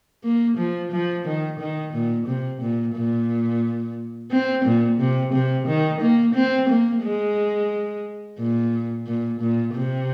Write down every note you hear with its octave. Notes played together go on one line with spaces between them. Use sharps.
A#3
F3
F3
D#3
D#3
A#2
C3
A#2
A#2
C4
A#2
C3
C3
D#3
A#3
C4
A#3
G#3
A#2
A#2
A#2
C3